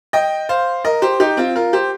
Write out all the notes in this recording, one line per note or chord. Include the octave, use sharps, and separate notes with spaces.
D#5 G5
C5 F5
A#4 D#5
G4 C5
D#4 G4
C4 F4
F4 A#4
G4 C5